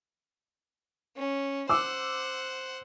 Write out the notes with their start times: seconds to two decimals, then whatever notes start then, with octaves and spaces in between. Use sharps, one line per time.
1.16 C#4
1.69 C5 F#5 D6 E6